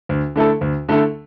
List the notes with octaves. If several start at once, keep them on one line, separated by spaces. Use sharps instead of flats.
D2
D3 A3 E4 A4
D2
D3 A3 E4 A4